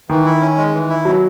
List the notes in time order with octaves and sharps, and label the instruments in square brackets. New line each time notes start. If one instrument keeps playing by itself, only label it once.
[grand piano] D#3 [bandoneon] E3
[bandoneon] E4
C#4
G#3
E3
E4
[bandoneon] B2 [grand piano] F#3